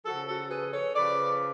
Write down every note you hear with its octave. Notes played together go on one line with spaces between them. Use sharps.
C#3 F3 F#4 A4
F#4 A4
G#4 B4
A4 C#5
C#3 F3 B4 D5